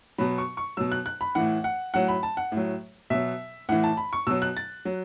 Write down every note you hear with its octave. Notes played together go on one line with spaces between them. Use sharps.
B2 F#3 B5
C#6
C#6
B2 F#3 E6
F#6
F#6
B5
A2 E3 F#5
F#5
A2 F#3 F#5
B5
A5
F#5
A2
F#3
B2 F#3 E5
A2 E3 F#5
A5
B5
C#6
B2 F#3 E6
F#6
A6
F#3